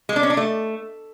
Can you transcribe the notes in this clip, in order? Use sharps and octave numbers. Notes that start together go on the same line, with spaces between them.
G#3
D4
C#4
D4
A3